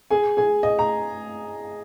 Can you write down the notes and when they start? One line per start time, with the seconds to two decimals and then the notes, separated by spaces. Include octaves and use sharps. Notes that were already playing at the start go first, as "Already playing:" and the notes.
0.11 G#4 G#5
0.37 G#4 G#5
0.63 D#5
0.79 A#5